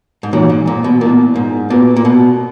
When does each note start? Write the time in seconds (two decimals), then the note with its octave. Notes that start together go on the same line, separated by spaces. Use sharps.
0.23 G#2
0.33 A#2 E3 G#3 D#4 F#4 C#5
0.50 G#2
0.67 A#2
0.84 B2
1.01 A#2 B3 E4 A#4
1.36 G#2
1.70 A#2 B3 F#4 B4
1.97 A#2
2.05 B2